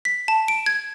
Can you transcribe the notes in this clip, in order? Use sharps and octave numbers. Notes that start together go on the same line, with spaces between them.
B6
A5
D7
G#6